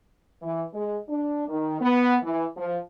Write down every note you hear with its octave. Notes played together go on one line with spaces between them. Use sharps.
E3
G#3
D4
D#3
B3
E3
F3